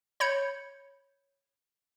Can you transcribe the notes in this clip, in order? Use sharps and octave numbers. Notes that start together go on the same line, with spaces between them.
C#5 B5 G6 G#6 C#7